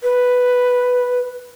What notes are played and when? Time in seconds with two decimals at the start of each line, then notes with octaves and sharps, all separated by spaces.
0.03 B4